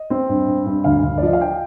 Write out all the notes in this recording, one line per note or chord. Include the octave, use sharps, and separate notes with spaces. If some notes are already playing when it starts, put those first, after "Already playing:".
Already playing: D#5
C4
G2
G2
G2
D2 F5
D2
D5
F3 D#5
F5
G5